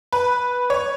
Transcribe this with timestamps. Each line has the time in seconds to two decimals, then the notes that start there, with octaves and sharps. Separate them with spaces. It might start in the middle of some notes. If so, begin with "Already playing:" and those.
0.12 B4
0.70 C#5